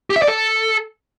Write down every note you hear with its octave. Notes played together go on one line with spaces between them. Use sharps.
G4
E5
D5
A4